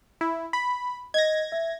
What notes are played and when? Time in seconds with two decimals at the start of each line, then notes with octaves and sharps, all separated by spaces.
0.21 E4
0.53 B5
1.14 D#5 G#6 A#6
1.52 E5